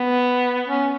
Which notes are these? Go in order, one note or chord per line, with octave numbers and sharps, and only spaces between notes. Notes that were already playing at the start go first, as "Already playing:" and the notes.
Already playing: B3
C#4